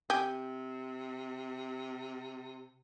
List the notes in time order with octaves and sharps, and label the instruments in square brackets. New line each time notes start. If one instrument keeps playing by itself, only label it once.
[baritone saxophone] C3 [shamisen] G4 [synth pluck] G5 G#5 D#6